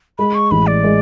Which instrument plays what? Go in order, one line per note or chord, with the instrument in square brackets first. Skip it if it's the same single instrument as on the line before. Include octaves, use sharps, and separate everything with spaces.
[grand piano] G#3 [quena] B5
[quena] C#6
[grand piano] A1 [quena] B5
[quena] D5
[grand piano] G#3